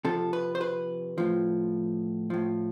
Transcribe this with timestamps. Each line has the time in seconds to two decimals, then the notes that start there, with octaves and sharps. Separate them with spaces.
0.05 C3 F3 A4
0.33 B4
0.55 C5
0.61 B4
1.18 A2 F3
2.30 A2 F3